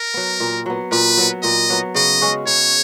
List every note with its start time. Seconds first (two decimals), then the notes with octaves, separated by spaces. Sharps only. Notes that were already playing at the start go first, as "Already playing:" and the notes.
Already playing: A#4
0.14 F#3 B3
0.40 A#2
0.66 F#3 B3
0.92 A#2 B4
1.17 F#3 B3
1.43 A#2 D#5
1.70 F#3 B3
1.95 C#3 D#5
2.21 G#3 C#4 F#4
2.46 C#3 C#5